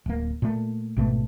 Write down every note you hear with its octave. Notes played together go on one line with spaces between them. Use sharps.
D1 A#3
A#2 A3
G#1 B2 A3